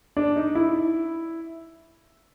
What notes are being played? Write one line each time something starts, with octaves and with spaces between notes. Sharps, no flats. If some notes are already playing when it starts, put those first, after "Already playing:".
D4
D#4
E4